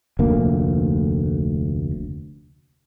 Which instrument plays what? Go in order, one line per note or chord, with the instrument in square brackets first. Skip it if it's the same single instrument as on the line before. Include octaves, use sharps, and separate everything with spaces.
[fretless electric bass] F1 D2 A#3